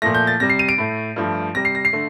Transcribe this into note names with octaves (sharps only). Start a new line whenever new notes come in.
A#2 F3 A3 A#6
G6
A6
C3 G3 A#6
C7
D#7
D7
A2 A3
G2 F3 A3
C3 G3 A#6
C7
A#6
C7
D3 A3